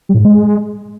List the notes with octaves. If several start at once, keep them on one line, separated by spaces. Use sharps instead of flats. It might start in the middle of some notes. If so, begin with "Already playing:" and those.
G3
A2
G#2
G#3